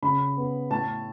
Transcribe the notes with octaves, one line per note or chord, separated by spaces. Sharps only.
C#3 B5
B3
A2 A5